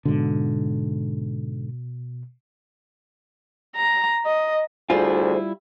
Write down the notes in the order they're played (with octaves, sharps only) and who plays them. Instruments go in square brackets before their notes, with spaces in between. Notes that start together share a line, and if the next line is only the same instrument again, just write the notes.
[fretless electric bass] G#2 D3 [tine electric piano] B2
[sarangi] A#5
D#5
[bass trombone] D2 [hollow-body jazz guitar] G3 E4 F4 [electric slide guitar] G#4 C5 G#5